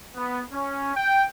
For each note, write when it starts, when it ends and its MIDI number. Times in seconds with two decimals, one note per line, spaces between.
0.15 0.43 59
0.53 0.94 61
0.96 1.25 79